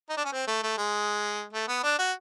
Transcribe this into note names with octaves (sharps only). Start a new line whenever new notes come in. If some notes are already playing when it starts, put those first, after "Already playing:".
D#4
D4
C#4
C4
A3
A3
G#3
A3
B3
D4
F#4